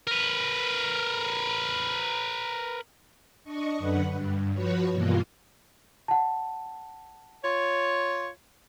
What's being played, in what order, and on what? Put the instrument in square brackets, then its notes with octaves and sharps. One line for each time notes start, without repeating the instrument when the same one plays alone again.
[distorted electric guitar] A#4 B4
[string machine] D4 D#5 C#6
F#2 D3 B4 F#5
G2
F3 F#4 B4 C#5
G2 B2 E3 A#3 F4
[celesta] F#5 A5
[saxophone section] F4 C#5